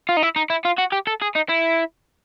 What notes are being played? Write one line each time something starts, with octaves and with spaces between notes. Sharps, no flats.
F4
D#4
E4
D#4
E4
F4
F#4
G4
A4
G#4
D#4
E4